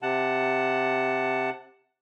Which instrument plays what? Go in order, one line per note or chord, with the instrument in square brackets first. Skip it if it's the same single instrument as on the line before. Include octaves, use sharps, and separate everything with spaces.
[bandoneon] C3 F#5 A5